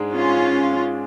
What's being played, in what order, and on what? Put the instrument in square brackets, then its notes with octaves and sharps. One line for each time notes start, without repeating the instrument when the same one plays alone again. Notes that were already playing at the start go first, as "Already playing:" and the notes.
Already playing: [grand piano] G#2 G#3 D4 G#4
[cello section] C#4 F4